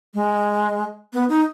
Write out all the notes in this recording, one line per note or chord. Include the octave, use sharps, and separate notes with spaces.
G#3
B3
D#4